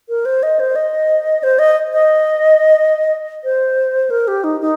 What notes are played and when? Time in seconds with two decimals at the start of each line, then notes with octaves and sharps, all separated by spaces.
0.09 A#4
0.25 C5
0.43 D#5
0.60 C5
0.76 D#5
1.43 C5
1.59 D#5
1.93 D#5
3.44 C5
4.10 A#4
4.28 G4
4.44 D#4
4.61 D#4